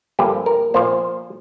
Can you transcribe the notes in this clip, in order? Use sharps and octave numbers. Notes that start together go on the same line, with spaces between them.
G2 D3 F3 A#3 G4
A#4
A#2 F3 A#3 C5